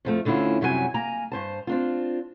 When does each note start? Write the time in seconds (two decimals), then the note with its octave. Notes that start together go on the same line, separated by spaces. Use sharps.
0.05 F2 F3 A3
0.25 D2 D3 C#4 E4 F4
0.61 F#2 C3 F#3 G3 A#4 G#5
0.94 A#3 G#5 A#5
1.32 G2 C5 A5
1.67 C4 D4 F4